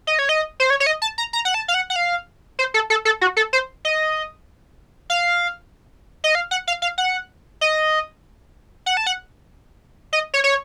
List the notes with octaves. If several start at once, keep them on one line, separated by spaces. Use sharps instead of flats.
D#5
C#5
D#5
C5
C#5
C#5
D#5
A5
A#5
A#5
F#5
A5
F5
F#5
F#5
F5
C5
A4
A4
A4
F#4
A4
C5
D#5
F5
D#5
F5
F#5
F5
F5
F#5
D#5
F#5
A5
F#5
D#5
C#5
C#5